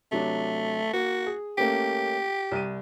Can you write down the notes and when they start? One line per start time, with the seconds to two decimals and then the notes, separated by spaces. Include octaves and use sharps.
0.12 C3 F#3 A3 D4
0.93 A#3 F#4
1.26 G#4
1.58 A3 A#3 C#4 G4
2.52 C2 D#7